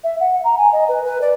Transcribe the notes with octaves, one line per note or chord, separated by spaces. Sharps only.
E5
F#5
A#5
G#5
D#5
B4
B4
D5